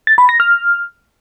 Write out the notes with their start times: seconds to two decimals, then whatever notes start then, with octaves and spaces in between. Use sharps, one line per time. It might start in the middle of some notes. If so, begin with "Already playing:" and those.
0.07 A6
0.18 B5
0.29 A#6
0.40 F6